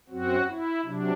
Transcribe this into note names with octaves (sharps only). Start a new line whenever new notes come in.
F#2 F#3 C4 F#4
E4
C3 F#3 D4